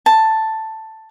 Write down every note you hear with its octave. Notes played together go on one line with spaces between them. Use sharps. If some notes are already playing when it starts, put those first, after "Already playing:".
A5